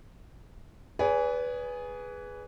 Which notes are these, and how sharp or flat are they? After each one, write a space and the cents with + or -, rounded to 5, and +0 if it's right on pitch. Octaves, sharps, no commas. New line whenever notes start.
G#4 +0 B4 +0 D5 -45